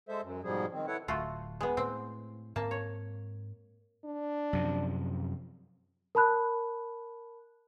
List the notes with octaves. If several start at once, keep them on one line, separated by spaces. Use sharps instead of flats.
G#3 A4 C5 E5
F#2
G#2 B2 F3 G3 G#4
D#3 C4
E4 A4 B4 C#5 F#5
D1 A3 F4 F#4
G#3 B3
A2 C4
G#2 A#3 C4 A5
C#5
D4
F#2 C3 F3
A#4 A5 B5 F#6